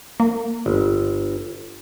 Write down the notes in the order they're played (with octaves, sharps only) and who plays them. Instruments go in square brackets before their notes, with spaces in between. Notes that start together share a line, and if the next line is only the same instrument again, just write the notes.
[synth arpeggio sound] A#3
[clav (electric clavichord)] G1